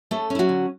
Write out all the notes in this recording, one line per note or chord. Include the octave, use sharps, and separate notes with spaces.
A3 C#4 A4
C#4 E4
F#3 F#4
D3